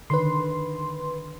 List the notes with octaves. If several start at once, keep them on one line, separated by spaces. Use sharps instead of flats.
D3 D#3 B4 C6